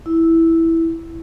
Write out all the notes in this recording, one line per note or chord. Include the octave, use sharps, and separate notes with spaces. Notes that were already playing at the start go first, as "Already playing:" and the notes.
E4